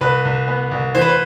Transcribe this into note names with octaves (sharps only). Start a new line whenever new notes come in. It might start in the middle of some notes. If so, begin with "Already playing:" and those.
C2 B4
C2
B3
C2
E3 C5
B4
C5